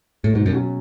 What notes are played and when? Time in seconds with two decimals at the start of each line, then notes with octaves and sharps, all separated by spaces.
0.24 A2
0.33 G#2 B2
0.46 F#2
0.52 F#3 C#4 F#4